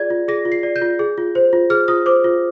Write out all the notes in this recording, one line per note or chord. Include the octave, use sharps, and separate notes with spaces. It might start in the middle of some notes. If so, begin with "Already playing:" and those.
Already playing: F4 G#4 D5 G#6
F4
G#4 A#6
F4
C7
D5
G6
F4
G#4
F4
C5
F4
G#4 F6
F4 D#6
C5 D6
F4